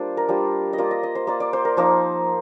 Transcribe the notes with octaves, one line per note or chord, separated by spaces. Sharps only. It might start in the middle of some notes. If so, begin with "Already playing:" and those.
Already playing: G3 A#3 D4 F4 C5 D5
A#4
G3 D4 F4 C5
D#5
A#3 F4 D5
D#5
D#5
C5
A#3 F4 D5
D5
C5
A#4
F3 A#3 D#4 C5